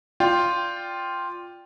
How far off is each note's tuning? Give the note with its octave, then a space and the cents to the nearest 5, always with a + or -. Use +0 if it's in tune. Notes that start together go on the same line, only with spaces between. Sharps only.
F4 +0 D5 +0 G5 +0